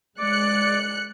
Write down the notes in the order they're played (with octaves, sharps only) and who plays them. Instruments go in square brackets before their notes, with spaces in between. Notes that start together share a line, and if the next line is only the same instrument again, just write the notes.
[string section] G#3 F#6 C#7 [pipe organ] D5